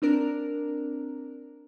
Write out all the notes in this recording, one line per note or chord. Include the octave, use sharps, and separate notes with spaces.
C4 D4 A#4